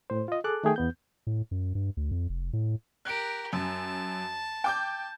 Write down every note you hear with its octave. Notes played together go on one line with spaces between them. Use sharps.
A2 C5
F4 D#5
G#4 A4 A5 D6 F#6
D#3 A3 G#4 G5
E2 B3 G6
A2
F#2
G2
D2
F2
F1
A2
G4 A#4 F#6 D7
F#2 A5
G5 D6 G6